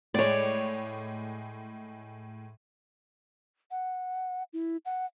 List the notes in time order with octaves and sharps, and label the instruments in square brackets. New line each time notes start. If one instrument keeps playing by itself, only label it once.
[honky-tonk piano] A2 G#3 [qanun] C#5 D5
[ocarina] F#5
E4
F#5